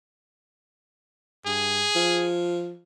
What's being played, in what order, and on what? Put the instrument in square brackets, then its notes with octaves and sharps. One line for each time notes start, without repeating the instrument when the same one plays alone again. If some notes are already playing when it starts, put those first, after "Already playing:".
[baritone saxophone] G2 [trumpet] G#4
[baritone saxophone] F3